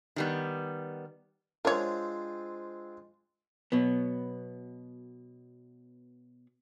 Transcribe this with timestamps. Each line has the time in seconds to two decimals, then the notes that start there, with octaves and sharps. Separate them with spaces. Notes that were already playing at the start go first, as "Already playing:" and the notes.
0.16 D#3 G3 B3
1.65 G#3 C4 D4 F4 A#4 C#5
3.72 B2 F#3 B3